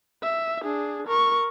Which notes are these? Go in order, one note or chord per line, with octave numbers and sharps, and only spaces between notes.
E5
D4 G#4
A#4 C#6